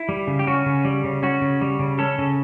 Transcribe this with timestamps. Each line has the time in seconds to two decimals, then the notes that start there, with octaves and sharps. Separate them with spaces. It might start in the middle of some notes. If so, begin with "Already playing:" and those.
Already playing: E4
0.09 G3
0.27 C#3
0.39 G4
0.47 C#4 F#4
0.66 C#3
0.85 G3
1.04 C#3
1.23 C#4 F#4
1.42 C#3
1.61 G3
1.79 C#3
1.99 C#4 A4
2.19 C#3